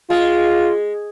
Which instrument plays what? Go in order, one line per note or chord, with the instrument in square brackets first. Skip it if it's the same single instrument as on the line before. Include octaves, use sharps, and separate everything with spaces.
[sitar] G#3 [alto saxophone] F4